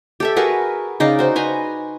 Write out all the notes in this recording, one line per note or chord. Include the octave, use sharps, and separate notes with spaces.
G4 A4 E5
F#4 G#4 A#4 B4
C#3 D#4 D5 F5
F#4 C5
B4 G#5 A#5 C6